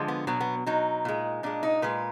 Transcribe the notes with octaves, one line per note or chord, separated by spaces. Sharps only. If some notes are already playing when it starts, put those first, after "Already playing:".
Already playing: D3 F3 G#3
B3
B2 F#3 B3
B3
B2 F#3 D#4
A#2 G#3
A#2 G#3 D4
D#4
A#2 G#3 B4